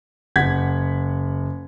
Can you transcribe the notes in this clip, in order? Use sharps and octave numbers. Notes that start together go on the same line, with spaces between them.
F#1 F#5 G#6 B6